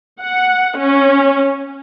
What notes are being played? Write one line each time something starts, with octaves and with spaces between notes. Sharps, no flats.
F#5
C#4